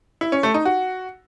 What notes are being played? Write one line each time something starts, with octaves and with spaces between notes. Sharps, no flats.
E4
C#4
A3
D#4
F#4